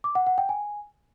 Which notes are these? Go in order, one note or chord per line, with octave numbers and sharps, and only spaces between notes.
D6
F#5
F#5
G5
G#5